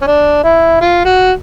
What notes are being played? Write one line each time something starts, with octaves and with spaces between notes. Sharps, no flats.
C#4
D4
E4
F4
F#4